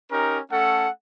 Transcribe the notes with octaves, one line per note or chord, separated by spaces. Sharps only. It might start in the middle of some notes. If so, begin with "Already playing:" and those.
C#4 D#4 G4 A#4
A3 C#4 A4 F#5